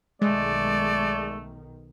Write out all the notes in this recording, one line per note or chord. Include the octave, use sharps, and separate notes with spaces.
B1 D#3 G#3 A3 D5